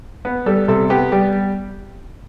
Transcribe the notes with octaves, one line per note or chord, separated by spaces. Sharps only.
B3
G3 A4
C3 A4
B3 G4
G3 G4